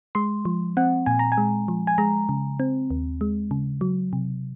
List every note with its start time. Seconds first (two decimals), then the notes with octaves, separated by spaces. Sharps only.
0.15 G#3 C6
0.45 F3
0.77 C4 F#5
1.06 A#2 G#5
1.19 A#5
1.32 G#5
1.38 G#3
1.68 F3
1.87 G#5
1.98 G#3 A#5
2.29 C#3
2.60 C4
2.91 D#2
3.21 G#3
3.51 C#3
3.81 F#3
4.13 C3